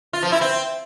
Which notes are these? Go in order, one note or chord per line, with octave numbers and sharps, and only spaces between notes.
F4
F3
E4
C4